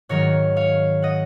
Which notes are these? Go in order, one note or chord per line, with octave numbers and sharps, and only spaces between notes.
G#2 D#3 F#3 A#4 C#5
C#5 F5
D#5 F#5